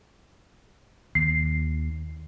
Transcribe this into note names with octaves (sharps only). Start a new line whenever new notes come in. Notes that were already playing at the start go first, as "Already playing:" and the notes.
D#2 C7